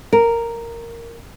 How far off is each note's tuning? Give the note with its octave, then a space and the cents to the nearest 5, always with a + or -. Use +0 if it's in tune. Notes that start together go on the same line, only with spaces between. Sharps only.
A#4 -5